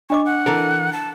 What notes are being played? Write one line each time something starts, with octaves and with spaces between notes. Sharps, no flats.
D4 D#5 C#6 D6
F#5
E3 A4 A#4
A5